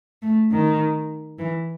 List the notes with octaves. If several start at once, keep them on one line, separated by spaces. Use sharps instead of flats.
A3
D#3
E3